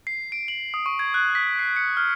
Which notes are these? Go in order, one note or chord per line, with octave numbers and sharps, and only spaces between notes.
C7
D7
F#7
D#6
C#6
G#6
F#6
B6
C7
C#7
F6